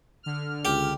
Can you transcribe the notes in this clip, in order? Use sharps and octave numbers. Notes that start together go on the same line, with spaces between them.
D3 F6
C#2 G4